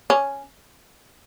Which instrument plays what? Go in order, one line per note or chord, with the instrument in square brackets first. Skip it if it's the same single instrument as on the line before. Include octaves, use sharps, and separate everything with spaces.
[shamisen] C#4